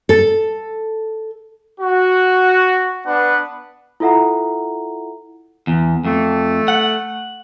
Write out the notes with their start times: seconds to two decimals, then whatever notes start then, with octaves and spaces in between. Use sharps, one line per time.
0.09 A4
1.81 F#4
3.06 B3 D4 B4 F#5
4.00 E4 F4 A4 E5 F#5 A#5
5.67 E2
6.05 F2 A3
6.68 F#5